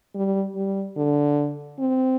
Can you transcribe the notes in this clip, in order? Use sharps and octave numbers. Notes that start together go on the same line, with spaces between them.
G3
G3
D3
C4